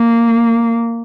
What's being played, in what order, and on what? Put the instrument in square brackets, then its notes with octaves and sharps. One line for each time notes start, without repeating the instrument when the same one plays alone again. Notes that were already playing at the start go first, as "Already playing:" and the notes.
Already playing: [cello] A#3